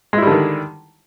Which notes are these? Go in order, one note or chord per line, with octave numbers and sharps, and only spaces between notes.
D3 D#3 G3 G#3 E4